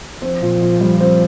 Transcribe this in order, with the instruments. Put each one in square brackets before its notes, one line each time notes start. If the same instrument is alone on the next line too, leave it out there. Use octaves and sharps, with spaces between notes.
[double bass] F3 [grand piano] C4
[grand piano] A#2
A#2
G3
C4